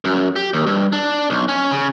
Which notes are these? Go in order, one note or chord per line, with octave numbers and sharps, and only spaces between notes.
F#2
G4
D#2
G2
D4
B1
C#4
C#3